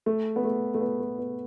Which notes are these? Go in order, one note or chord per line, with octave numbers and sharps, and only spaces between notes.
A3
B3
A3
A3
B3
A3
B3